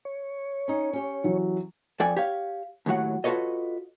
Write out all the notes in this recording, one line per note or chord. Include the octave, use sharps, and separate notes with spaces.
C#5
C#4 D#4
C#4 G4
E3 F#3
F2 A4 D5 G5 G#5
G4 C#5 F5
D#2 A2 F#3 F#5
F4 F#4 A4 B4 C#5 D#5